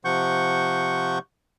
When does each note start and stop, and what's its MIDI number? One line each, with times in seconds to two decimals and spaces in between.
0.05 1.19 48
0.05 1.19 53
0.05 1.19 78
0.05 1.19 85
0.05 1.19 91